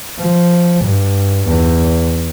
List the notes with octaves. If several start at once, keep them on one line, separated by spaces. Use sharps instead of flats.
F3
G2
E2